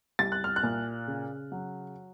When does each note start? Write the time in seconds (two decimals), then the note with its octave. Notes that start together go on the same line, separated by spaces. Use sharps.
0.19 C2 A6
0.32 F#6
0.44 F6
0.56 F#6
0.63 A#2
1.07 C#3
1.52 F#3